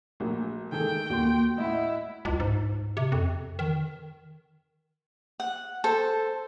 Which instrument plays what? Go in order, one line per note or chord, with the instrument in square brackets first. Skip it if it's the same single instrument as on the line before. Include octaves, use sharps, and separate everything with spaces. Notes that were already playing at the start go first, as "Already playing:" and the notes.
[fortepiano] A#1 F#3 [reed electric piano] A3
[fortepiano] D#3 G#3 A4 [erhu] G5
[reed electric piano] D#2 A#3 C6 [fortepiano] A#2 F#4
[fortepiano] A2 F#5 [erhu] E4 [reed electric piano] D#5
[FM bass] C#2
G#2
C3
F2
D#3
[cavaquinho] F#5
A4 C5